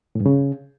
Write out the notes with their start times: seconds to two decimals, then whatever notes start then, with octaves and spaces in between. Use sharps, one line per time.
0.15 A2
0.20 G2
0.26 C#3